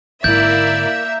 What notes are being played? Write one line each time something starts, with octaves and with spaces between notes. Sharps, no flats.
G#1 D3 A#3 E4 D5 E5 G6